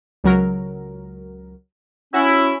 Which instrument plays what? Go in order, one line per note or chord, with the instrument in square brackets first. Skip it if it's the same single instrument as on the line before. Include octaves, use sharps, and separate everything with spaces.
[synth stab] C#2 F#3 A#4
[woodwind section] C#4 E4 [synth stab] F#4